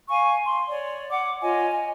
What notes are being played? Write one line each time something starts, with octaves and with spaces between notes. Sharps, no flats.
F5 G#5 C#6
C6
C#5 D5
F#5 D6
F4 C#5 D#5 G#5
G#5